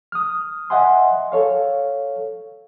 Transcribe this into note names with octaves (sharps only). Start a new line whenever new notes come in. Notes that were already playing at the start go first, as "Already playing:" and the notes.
D#6 F6
D#5 E5 F#5 G#5 C6
A4 C#5 F5